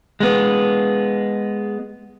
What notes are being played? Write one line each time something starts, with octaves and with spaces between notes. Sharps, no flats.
G#3 B3